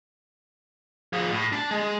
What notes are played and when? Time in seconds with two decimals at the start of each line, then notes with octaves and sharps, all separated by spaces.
1.13 F3 G#4
1.31 A2
1.53 D4 A5
1.71 G#3